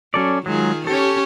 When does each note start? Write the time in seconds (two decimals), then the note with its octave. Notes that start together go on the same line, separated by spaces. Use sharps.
0.14 F#3 C#4 A4 D5
0.46 D#3 F#3 G#3 F4 G#4
0.87 C#4 G4 A4 C#5